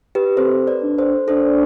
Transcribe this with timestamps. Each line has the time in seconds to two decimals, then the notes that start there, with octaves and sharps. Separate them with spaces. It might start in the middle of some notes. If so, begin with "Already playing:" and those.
0.15 G4 B4
0.37 C4 A4 C5
0.67 B4 D5
0.82 D4
0.98 A4 C5
1.28 D4 A4 C5